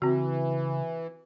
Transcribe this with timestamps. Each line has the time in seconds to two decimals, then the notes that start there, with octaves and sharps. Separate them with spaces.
0.02 C#3 E3 C4 F#4